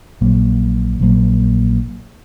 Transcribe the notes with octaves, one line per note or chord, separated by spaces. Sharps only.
A#1 A#2 F#3 A#3
A#1 A#2 F#3 A#3